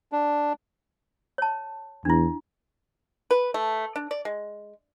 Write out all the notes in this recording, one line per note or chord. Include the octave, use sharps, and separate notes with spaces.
D4
C#5 A5
E2 D4 E4
B4
A3
D4
D5
G#3